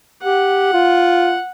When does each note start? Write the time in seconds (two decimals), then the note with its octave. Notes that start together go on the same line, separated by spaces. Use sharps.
0.23 G4 F#5
0.73 F4